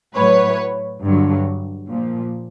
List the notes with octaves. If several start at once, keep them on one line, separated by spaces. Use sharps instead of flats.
A2 F#3 B4 C#5
G2 D3 F#3
A#2 F3